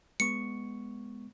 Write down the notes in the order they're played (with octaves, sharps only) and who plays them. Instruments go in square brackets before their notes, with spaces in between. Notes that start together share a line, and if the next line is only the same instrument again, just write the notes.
[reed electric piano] G#3 B3 C#6 [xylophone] C#7